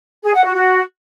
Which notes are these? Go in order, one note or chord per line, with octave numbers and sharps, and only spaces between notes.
G#4
F#5
F#4
F#4